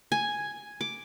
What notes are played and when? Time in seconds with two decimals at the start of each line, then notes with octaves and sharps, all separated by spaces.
0.12 G#5
0.81 D6